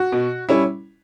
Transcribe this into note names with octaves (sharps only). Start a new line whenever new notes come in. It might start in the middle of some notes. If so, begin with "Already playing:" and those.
Already playing: F#4
B2
G3 C#4 E4